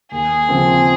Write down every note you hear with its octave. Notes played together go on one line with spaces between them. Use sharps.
D#2 G#4
C#3 F3 C4